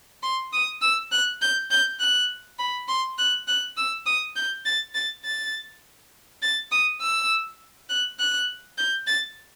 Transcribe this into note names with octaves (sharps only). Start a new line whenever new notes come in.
C6
D#6
E6
F#6
G6
G6
F#6
B5
C6
F#6
F#6
E6
D#6
G6
A6
A6
A6
A6
D#6
E6
F#6
F#6
G6
A6